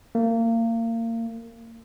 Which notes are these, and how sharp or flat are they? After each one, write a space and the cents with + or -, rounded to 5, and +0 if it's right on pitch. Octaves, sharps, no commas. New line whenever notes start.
A#3 -30